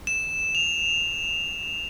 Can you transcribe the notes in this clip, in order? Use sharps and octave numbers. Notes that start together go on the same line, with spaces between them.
E7
F7